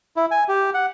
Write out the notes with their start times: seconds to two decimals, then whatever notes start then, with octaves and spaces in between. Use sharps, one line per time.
0.16 E4
0.31 G#5
0.48 G4
0.74 F#5